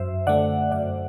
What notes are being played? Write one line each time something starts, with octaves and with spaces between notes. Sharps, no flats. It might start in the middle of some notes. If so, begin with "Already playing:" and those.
Already playing: F#2 C5 E5
D3 A3 D5 F#5
F#2 D5 F#5